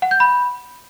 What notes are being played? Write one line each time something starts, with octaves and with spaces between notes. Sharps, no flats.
F#5
G6
B5